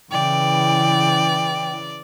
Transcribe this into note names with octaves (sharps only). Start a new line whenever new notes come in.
C#3 E3 D5 G5